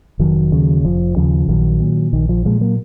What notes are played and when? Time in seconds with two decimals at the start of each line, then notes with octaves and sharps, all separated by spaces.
0.19 F1 D#3 F#3
0.52 D#2 C#3
0.84 F1 F3
1.16 D#2 C#3 F3
1.48 A#1 D#3 F#3
1.80 A#2
2.13 A#1 D#3
2.29 F3
2.45 A#2 F3 G#3
2.61 F#3 A#3